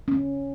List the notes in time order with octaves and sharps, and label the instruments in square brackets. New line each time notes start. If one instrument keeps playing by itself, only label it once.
[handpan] C#4